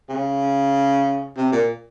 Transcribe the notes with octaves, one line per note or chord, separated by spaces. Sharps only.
C#3
C3
A#2